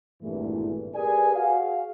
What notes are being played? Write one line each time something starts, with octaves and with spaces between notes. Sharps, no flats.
G#1 E2 G2 A#2 E3 A3
G4 G#4 A#4 B4 D5 G#5
F#4 G#4 F5